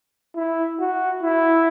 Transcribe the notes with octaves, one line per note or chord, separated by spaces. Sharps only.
E4
F#4
E4